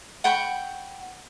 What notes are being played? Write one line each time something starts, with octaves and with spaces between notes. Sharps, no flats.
F#5 G5 B5 C#6